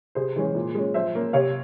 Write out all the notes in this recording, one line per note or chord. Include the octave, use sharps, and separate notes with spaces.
C3 G#4 C5
E3 G#3 C#4
A#2
G#3 C#4
F3 C5 E5
A#3 C#4
C3 C#5 F5